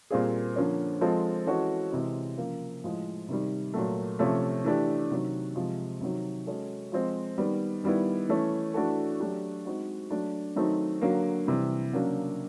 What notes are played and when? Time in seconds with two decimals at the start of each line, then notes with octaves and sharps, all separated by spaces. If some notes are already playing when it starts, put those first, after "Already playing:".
0.11 A#2 G3 C4 F4 G#4
0.56 D3 F3 A#3 C#4
1.01 F3 G#3 C4 F4 A4
1.46 E3 G#3 C#4 F#4 A4
1.92 C3 E3 G#3
2.38 C#3 F3 A#3
2.84 A2 F3 G#3
3.29 C3 D#3 G3
3.74 A#2 F#3 A3
4.19 C3 F3 A3 C#4
4.64 E3 A3 D4 G4
5.11 C3 D#3 F#3
5.56 C3 F3 G#3
6.01 C3 D#3 F#3
6.47 G#3 C#4 F#4 A4
6.92 F3 G#3 C4
7.38 D#3 G3 B3
7.84 D#3 G3 B3 E4
8.29 E3 A3 C#4
8.74 E3 A3 D4 F#4 A4
9.20 F#3 A3 D4 G4
9.65 G#3 C4 D#4 F#4
10.11 F#3 A3 D4
10.56 D#3 F#3 A3 C4 D#4
11.01 D3 F#3 A#3
11.47 C3 E3 G3
11.93 C#3 F#3 A#3 D4